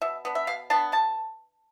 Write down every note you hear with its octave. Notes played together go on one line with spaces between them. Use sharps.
B2 E5
B3 D4
E5
B2 F5
B3 D4 A5
B2 A5